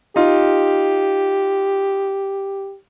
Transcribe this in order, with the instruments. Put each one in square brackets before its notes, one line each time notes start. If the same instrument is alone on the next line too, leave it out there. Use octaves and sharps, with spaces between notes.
[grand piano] D#4 F4 [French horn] G4